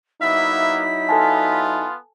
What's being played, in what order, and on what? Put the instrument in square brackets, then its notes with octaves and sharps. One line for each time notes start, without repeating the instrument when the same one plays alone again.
[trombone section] F#3 D#4 E4 [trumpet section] A#3 B3 E5 [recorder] B6
[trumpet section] B3 F4 [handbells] A4 G#5 A5